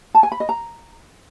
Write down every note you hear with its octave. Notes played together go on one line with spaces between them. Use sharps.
A5
G#5
B5
D#5
A#5